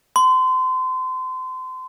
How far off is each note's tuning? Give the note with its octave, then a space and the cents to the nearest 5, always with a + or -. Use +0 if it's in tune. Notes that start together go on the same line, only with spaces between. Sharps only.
C6 -30